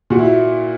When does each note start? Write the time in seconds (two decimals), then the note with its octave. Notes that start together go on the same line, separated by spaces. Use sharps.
0.10 A#2 F#4
0.19 E4